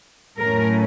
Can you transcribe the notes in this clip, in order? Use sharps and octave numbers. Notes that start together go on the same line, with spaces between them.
A2 F#3 A3 C#4 A#4